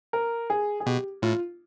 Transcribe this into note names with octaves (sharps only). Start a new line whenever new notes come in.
A#4
G#4
G#4
B2 G4
A2 F4